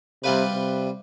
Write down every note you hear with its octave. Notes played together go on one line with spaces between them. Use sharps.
C3 G3 F4 B4
C3